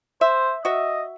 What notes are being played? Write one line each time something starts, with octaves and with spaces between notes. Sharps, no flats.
C5 E5
F#4 D#5 E5